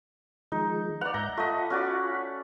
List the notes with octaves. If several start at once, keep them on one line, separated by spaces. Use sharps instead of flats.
D#3 F3 G#3 D#4
B4 D5 F#5 F6 F#6
G#2 E5 A#5 G6
A3 F4 D#5 F#5 B5
C#4 F#4 D5